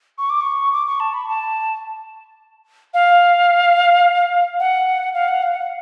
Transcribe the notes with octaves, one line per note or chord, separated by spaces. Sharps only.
C#6
D6
C#6
D6
C#6
A5
B5
A5
F5
F#5
F5
F#5
F5
F#5